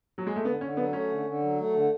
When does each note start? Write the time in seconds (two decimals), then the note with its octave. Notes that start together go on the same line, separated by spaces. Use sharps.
0.18 F#3
0.27 G#3
0.36 A3
0.45 D3 B3
0.61 D3 C#4
0.77 F#3 B3
0.93 A3 C#4
1.09 D3
1.26 D3
1.42 F#3
1.58 A3
1.74 D3